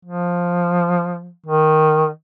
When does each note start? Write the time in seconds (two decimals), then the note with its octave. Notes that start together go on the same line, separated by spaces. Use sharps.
0.05 F3
1.46 D#3